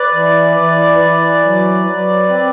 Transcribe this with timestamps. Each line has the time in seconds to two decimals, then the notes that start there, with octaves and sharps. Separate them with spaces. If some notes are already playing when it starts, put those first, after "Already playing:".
Already playing: B4 D5
0.13 E3
0.57 E3
0.99 E3
1.43 F#3
1.86 F#3
2.29 C4